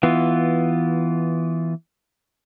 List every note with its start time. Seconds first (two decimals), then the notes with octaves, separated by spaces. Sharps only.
0.03 E3 B3 F4